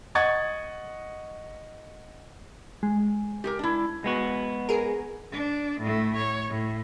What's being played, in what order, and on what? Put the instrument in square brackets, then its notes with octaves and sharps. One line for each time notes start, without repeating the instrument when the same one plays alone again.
[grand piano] D#5 F#5 C#6 G#6 A6
[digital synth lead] G#3
[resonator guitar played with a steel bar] G4 G#4 A#4
D4 E4
[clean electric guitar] G#3 B3 F#4
[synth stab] G#4 A#4
[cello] D4
A2 A3
C#5
A2